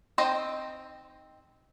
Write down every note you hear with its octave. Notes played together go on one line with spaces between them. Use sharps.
C4 D#4 C5 D#5 G5